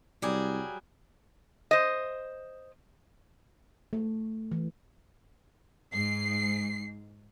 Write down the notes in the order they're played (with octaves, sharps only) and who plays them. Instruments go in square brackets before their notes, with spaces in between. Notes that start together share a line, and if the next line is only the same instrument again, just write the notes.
[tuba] C2 [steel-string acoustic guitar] F#3 G3 G#4
[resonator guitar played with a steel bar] C5 D#5
[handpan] A3
E3
[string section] G#2 C7